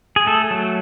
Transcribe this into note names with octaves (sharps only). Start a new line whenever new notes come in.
G#4
A3 A4
F#3